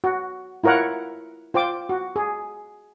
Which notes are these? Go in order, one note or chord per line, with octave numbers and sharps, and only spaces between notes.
F#4
E4 F4 A#4 C#5 F#5
F4 C5 G5 D6
F#4
G#4